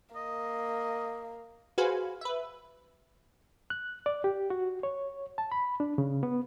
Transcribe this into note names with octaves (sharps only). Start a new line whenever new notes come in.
A#3 D#5
F#4 G#4 B4 C5 F5 G#5
B4 E5
F#6
D5
G4
F#4
C#5
A5
B5
D4
C#3
B3